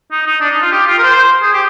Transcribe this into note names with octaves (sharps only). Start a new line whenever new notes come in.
D#4
D#4
D4
D#4
F4
G4
F4
A#4
C5
G#4
G4